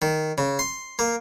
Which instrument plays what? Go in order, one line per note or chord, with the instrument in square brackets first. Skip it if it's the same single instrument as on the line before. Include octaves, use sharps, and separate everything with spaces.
[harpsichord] D#3
C#3
C6
A#3